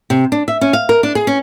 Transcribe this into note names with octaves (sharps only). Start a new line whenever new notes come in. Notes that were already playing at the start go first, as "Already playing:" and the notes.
C3
D4
E5
C#4
F5
A#4
D4
G#4
C#4